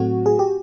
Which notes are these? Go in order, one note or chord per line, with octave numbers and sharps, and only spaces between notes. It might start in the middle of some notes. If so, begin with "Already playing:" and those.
Already playing: A2 F#3 A3 C4 F#4
G#4
G4